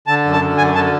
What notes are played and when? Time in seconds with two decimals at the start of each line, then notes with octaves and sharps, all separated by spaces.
0.07 D3 A5
0.25 F#2
0.33 A5
0.42 D3
0.58 F#2 G#5
0.75 D3 A5